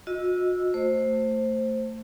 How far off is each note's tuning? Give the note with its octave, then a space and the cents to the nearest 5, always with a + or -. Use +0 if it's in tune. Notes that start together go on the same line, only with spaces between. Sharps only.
F#4 -40 D#5 +0 E6 +0
A3 +25 C5 +10